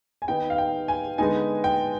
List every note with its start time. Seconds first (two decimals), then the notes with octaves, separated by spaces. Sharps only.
0.22 G#5
0.28 D#3 B3 D#4 G5
0.50 F5
0.58 G5
0.88 G#5
1.18 D3 G#3 B3 D#4 G#5
1.64 G5